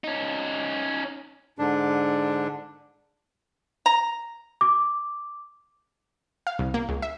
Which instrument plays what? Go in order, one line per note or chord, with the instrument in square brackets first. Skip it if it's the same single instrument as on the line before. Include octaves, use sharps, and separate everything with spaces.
[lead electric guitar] C#4 D#4
[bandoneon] G#2 D3 D4
[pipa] A#5
[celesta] D6
[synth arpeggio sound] F5
C2
A#3
C#2
E5